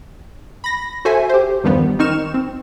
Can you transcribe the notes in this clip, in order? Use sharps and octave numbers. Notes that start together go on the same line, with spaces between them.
B5 A#6
F#4 A4 C5 E5 G#5
G4 C5
E2 G2 D#3 F3 G3 B3
D#3 C4 D#4 C#6 F6 E7
C4